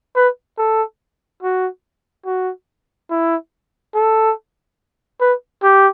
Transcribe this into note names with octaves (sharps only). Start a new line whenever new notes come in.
B4
A4
F#4
F#4
E4
A4
B4
G4